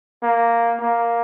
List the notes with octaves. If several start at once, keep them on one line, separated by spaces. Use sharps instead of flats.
A#3
A#3